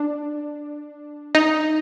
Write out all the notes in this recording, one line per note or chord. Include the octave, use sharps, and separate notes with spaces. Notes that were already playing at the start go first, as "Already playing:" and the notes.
Already playing: D4
D#4